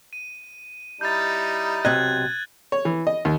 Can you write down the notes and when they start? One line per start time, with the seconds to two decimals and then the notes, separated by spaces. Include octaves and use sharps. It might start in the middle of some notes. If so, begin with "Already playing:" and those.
0.13 D#7
1.01 G3 D#4 E4 G6 A6
1.85 B1 C3 D#5 F#6 G#6 F#7
2.72 C#5
2.85 E3
3.07 D#5
3.25 D#2